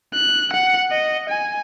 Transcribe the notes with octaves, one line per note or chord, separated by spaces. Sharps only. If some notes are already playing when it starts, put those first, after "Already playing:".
F#6
F#5
D#5
G#5